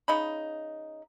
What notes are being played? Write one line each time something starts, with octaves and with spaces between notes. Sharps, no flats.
C#3 D#4 B5